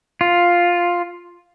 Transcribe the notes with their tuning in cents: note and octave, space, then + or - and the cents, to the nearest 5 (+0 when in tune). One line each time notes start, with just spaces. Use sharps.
F4 +5